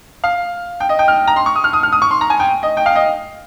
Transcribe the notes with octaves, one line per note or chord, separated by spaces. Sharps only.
F5
G5
D#5
G5
F6
A#5
C6
C#6
D#6
F6
D#6
F6
D#6
C#6
C6
A#5
G#5
G5
D#5
G5
F5
D#5